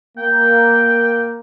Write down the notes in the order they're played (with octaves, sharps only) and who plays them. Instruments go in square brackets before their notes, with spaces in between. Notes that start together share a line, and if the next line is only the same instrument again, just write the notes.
[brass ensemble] A#3 [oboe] G5